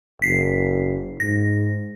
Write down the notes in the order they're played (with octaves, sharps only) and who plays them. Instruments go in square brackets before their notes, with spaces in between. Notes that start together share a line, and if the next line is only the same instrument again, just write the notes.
[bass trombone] F#1 [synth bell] B6 C7
[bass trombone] G#2 [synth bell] A#6